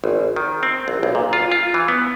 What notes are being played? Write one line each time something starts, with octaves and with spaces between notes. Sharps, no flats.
G#1
D#3
C4
A#1
B1
A#2
F4
F4
E3
B3